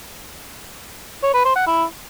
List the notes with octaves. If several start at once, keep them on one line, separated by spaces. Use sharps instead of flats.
C#5
B4
C5
F#5
E4